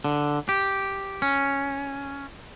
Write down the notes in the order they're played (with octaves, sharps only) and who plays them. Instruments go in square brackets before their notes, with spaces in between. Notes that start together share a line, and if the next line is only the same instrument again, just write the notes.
[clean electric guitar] D3
G4
C#4